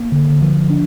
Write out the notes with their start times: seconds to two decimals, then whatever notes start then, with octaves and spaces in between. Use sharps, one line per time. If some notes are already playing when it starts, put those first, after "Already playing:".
Already playing: A#3
0.12 D3
0.42 F3
0.70 D4